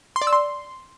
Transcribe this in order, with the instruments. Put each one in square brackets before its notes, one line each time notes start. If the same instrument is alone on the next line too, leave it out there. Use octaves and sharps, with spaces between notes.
[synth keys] C6
D5
E6
C6